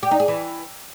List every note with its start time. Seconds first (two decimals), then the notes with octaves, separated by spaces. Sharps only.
0.03 G4
0.11 D#4
0.20 G#4
0.28 E3